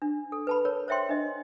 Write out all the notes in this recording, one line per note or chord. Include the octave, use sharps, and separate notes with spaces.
D4
A4
B4 A5 B5
A#4 C#5
C5 C#5 E5 G5 C6
D4 D#5